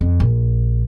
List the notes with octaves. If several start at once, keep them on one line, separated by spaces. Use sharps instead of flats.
F2
A#1